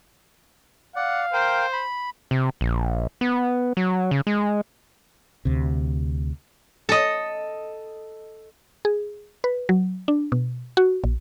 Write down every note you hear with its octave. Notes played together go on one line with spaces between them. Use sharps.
D5 F5 F#5
A#4 C5 G5
B5
C3
A#1
B3
F#3
C#3
G#3
D2 C3
A4 D#5
G#4
B4
F#3
D4
B2
F#4
A#1